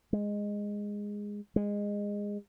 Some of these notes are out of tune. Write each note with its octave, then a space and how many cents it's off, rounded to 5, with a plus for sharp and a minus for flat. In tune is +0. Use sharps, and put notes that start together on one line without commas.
G#3 -10
G#3 -20